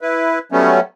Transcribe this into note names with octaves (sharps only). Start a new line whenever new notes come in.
E4 B4
F#3 G3 A3 B3 C#4